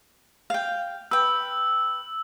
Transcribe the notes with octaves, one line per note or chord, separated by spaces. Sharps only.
F5 G5
B4 G5 E6